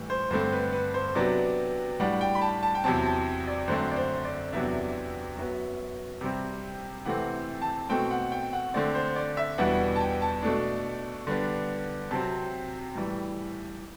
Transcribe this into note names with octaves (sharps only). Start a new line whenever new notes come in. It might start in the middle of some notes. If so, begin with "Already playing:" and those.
Already playing: A2 E3 G3
C5
G2 D3 A3 C4 C5
B4
B4
C5
C3 F#3 B3 D4 D5
A2 G3 D4 F#5
G5
B5
A5
A5
G5
E2 C3 F#3 C4 A5
A5
D5
F#2 D3 A3 C4 C5
D5
C5
D5
E2 C3 F#3 B3 D4 E5
F#2 F#3 B3
C3 G3 C4
C3 E3 A3 C4 F#5
A5
B2 A3 C4 G5
F#5
G5
F#5
D3 A3 C4 D5
C5
D5
E5
E2 B2 G3 B3 D4 F#5
A5
G5
A5
B2 A3 D4
D3 G3 B3 D4
C3 F#3 C4 A5
A2 E3 G3